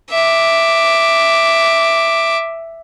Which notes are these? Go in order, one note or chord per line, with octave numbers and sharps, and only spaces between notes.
E5 D6